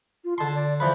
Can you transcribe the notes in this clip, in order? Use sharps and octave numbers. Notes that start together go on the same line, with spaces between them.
F4
D3 A5 C6
D5
E3 F3 B4 D5